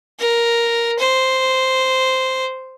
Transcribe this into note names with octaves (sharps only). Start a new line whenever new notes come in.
A#4
C5